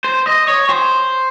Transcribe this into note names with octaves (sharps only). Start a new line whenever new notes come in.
C5
D#5
C#5
C5